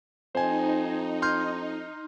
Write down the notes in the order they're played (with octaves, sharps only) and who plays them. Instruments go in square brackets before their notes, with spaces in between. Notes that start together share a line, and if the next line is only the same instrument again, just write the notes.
[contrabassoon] F2 [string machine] D#4 [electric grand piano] C5 G#5
[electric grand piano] C6 F6 G6